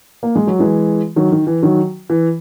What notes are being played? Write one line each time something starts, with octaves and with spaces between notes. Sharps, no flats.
A#3
G#3
F#3
E3 G#3
D#3 F#3
D#3
E3
D#3 F#3
E3